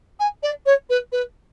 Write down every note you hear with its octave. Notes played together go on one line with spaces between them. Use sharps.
G#5
D5
C#5
B4
B4